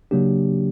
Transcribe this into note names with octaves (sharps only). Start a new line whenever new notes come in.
C#3 F#3 A#3 D4 G4